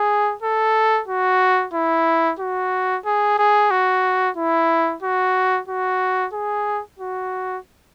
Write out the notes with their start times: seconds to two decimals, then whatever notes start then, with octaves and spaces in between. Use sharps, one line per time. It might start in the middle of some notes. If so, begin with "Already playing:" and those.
Already playing: G#4
0.42 A4
1.08 F#4
1.73 E4
2.39 F#4
3.05 G#4
3.38 G#4
3.71 F#4
4.37 E4
5.02 F#4
5.68 F#4
6.33 G#4
6.99 F#4